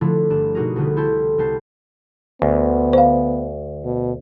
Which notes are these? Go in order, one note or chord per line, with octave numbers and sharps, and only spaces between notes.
D3 F3 A3 D4 E4 F4
G1 D4 E7
B2 D#4 F#4 G#4 A#4
C2 D3 B3
E4 A4 C5 G5 A5 C6
C2 B3 C5 A5 C7
D2 B3
C5 F5
B2